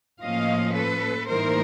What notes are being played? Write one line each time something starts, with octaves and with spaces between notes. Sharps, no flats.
A2 F3 A#3 C#4 D#5 F5
A4 B4
A2 E3 G3 A#3 D#4 A#4 C5